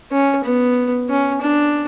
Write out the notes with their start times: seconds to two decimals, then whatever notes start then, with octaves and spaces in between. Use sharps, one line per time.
0.11 C#4
0.44 B3
1.09 C#4
1.41 D4